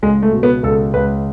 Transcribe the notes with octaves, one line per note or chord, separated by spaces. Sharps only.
C#2 G#3
A3
B2
B3
C#2 A4
C#2 B4